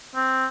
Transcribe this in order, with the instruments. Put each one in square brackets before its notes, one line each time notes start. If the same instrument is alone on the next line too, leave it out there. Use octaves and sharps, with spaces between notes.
[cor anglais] C4